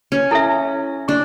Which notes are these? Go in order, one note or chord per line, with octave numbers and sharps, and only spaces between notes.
C#4
E4 A4 E5
D4 C#6